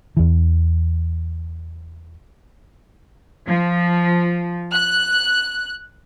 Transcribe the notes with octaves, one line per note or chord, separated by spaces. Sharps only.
E2 E3
F3
F#6